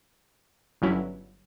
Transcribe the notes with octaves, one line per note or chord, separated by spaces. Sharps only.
G1 G2 F#3 C#4 E4